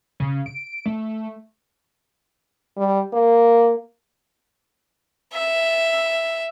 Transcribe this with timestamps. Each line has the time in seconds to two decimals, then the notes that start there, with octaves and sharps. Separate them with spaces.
0.20 C#3
0.46 D7
0.86 A3
2.77 G3
3.13 A#3
5.34 E5